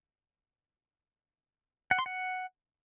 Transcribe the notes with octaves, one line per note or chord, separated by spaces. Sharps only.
F#5
C6
F#5